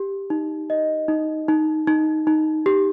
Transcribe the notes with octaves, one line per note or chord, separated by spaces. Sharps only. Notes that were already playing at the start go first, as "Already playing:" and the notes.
Already playing: G4
D#4
D#5
D#4
D#4
D#4
D#4
G4